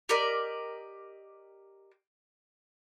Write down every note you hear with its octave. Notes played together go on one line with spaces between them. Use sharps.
G4 A#4 D5 D#5